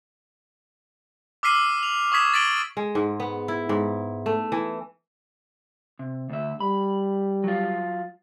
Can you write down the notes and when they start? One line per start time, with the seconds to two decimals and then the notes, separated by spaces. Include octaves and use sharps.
1.43 D6 E6 F6 B6 C7 D#7
1.83 F7
2.12 C#6 D#6 G#6 B6 E7
2.34 A6 B6 D7 F#7 G7
2.77 G#3
2.95 G#2
3.20 B3
3.48 E4
3.69 G#2
4.26 A3
4.52 E3
5.99 C3
6.30 D2 E5
6.61 G3 B5
7.44 F#3 F4